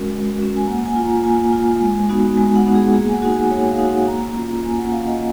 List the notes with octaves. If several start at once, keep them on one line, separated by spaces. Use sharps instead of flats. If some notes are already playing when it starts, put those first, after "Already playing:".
Already playing: G#3 C#4 F#4 A#4
G#3
C#4 F#4
G#5
A#3 F#5
G#5
F4
A#5
A#3 G#5
F4
G#3
B3 D#4 F#4
G#3 G#5
F#5
B3 D#4 F#4
G#4
A#3 G#4
G#5
F#5
D#4 F#4
G#5
A#3 C#5
F5
D#4 F#4
F#5
A#3 A#5
C#4 F4
A#3 G#5
F#5
C#4 F5
F4
D#5